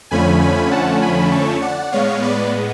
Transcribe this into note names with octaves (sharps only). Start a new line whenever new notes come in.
F2 D3 F3 A3 C#4 G#5 B5
G#5 B5
F#5 A5
G#5 B5
A5 C#6
D5 F#5
A2 G#3 B3 C#5 F5
B4 D5